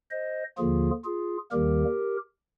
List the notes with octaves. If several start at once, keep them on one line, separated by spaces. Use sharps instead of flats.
C5 D#5
D#2 D3 F3 A#3 F4 G#4
F4 G#4
D#2 D#3 G3 A#3 G4 A#4